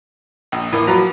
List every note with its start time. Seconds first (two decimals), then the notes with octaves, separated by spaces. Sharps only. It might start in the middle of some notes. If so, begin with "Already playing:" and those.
0.52 A#1
0.73 A2 E3 A#3
0.87 F3 F#3 B4 A#5